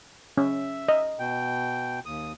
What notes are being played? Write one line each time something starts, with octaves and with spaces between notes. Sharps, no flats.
C#4 E5
D#5
B2 G5
D#2 D#6